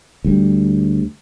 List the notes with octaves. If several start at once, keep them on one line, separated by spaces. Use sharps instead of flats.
D2 G3